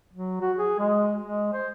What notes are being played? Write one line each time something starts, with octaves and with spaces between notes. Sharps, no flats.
F#3
F#4
G#4
G#3
G#3
C5